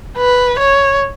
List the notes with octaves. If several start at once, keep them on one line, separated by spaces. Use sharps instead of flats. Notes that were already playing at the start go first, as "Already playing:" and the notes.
B4
C#5